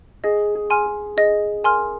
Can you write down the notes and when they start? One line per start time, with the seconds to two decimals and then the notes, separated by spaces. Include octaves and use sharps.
0.24 G#4 D#5
0.55 G#4
0.70 G#5 C6 F6
0.86 G#4
1.17 G#4 D#5
1.63 A#4 G#5 C6 F6